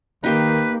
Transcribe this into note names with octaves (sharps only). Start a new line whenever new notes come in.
D#3 A#3 D#4 G4 B4 C6